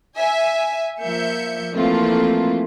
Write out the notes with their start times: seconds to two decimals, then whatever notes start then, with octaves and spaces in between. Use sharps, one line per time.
0.16 E5 G#5
1.02 F3 A#3 E5 G6 C#7
1.76 E3 F3 A3 A#3 C4 F4